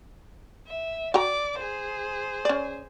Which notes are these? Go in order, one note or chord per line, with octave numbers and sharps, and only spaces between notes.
E5
F#4 D5 G5 A#5 D6
G#4 C5
C#4 D5